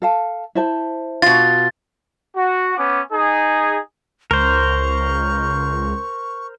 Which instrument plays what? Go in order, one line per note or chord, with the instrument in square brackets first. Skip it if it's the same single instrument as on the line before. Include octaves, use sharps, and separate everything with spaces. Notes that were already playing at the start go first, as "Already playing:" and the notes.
[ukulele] A4 F5 A5
E4 C5 A5
[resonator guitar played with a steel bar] B2 F4 [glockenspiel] A6
[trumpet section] F#4
B3 C#4 D6
D#4 G#4
[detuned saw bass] C#2 [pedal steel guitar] A#4 C5 [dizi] C#6